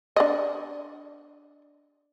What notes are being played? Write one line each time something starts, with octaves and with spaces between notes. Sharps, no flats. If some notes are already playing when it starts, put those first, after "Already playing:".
D4 D5 D#5